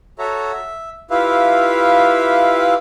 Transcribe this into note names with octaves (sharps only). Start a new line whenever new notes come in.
F#4 A4 C#5 E5 A#5
E5
E4 F4 G4 B4 E5 F5